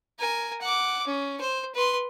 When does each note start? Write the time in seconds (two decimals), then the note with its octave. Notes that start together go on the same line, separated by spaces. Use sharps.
0.20 A#4 G#5
0.61 F#5 D6
1.07 C#4
1.41 C5
1.75 B4 C6